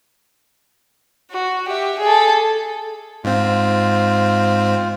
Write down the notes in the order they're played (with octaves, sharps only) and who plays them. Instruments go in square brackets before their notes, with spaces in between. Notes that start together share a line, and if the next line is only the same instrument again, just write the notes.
[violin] F#4
G4 E5
G#4 A4
[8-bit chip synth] G#2 C4 [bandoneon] F4